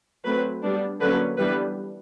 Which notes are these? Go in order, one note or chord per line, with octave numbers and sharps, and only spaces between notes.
F#3 A3 C4 B4
G3 B3 D4
D3 F#3 A#3 C#4 B4
E3 G3 B3 D4 B4